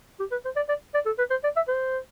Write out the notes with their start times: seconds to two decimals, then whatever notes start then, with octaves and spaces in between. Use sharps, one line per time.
0.20 G4
0.32 B4
0.45 C5
0.56 D5
0.69 D5
0.95 D5
1.06 A4
1.18 B4
1.31 C5
1.44 D5
1.56 E5
1.68 C5